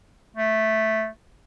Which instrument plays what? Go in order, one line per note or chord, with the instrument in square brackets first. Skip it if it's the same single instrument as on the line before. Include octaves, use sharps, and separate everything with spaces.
[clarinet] A3